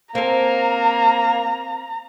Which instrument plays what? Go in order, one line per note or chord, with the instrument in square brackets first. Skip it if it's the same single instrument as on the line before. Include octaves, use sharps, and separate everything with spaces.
[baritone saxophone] A#3 [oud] C4 A4 [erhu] A#5